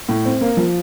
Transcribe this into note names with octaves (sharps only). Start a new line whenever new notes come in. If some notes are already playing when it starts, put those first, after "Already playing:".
A2
C4
A#3
F3